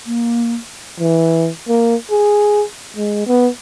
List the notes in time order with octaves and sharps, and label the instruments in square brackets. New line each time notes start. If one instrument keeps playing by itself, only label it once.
[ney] A#3
[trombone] E3
A#3
G#4
G#3
B3